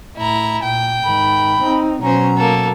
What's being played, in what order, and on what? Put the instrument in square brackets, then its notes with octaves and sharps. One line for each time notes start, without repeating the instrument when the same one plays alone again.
[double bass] A2 [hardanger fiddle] E4 A#5
[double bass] A#2 [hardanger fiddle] G5
[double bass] G#2 D#3 [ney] B5
[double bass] C4 D#4
[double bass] B2 F#3 [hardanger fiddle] C#4 C5 [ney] A#5
[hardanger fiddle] A#3 A4